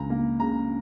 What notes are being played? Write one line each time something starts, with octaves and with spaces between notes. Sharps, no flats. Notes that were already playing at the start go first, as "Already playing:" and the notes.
Already playing: C#2 A#5
A#3
C#3 A#5